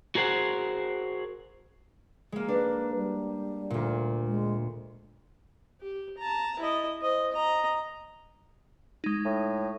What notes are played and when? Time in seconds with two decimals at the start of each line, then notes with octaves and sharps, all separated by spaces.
0.15 F#4 G#4 A#4 C5 F#5
2.32 G#3 A#3
2.48 D4 B4
2.95 G3
3.70 D2 A#2
4.27 G#3
5.80 G4
6.17 A5 A#5
6.59 E4 D#5
7.02 C5 D#5
7.32 D#5 A#5
9.04 G#3 D#4
9.25 A2